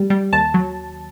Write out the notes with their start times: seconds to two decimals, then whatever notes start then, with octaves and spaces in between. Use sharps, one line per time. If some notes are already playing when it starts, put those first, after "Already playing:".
Already playing: G3
0.10 G3
0.33 D#2 A5
0.54 F#3